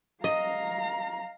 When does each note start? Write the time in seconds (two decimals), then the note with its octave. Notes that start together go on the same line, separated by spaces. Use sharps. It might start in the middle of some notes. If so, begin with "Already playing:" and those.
0.24 D#5 F5 A#5